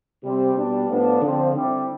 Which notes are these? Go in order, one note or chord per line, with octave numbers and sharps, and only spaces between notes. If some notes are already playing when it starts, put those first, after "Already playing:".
C3 G3 C4
B2 G3 D4
A2 F3 B3 D4
D3 F3 C4
D3 G3 C4 E4